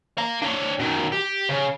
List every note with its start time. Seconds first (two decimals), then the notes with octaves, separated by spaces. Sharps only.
0.18 F5 A#5
0.42 D4 C#5
0.79 B2 D#3
1.12 G4
1.49 C#3